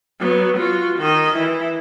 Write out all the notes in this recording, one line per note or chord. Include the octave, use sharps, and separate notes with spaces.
F#3 B3
F4 F#4
D#3 D#5
E3 E4